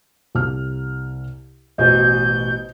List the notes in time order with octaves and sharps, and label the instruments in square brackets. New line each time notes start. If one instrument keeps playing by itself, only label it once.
[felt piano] C2 F6
[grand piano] A1 B2 G#5 [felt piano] F#4 C5 D#5 [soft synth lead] G6